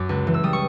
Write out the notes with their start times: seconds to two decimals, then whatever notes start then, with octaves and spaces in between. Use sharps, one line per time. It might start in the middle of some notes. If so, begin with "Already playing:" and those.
Already playing: F#2 D6
0.09 C#2
0.27 E3
0.34 E6
0.43 G3 D#6
0.53 C#6